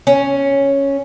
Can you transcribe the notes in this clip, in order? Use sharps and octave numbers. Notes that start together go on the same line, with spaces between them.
C#4